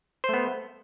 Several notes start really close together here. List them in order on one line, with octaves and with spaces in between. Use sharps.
C5 A3 B3